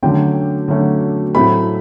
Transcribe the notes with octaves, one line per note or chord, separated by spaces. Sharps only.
D3 F#3 A3 C#4 G5
D3 F#3 A3 C#4
A2 F#3 A3 C4 B5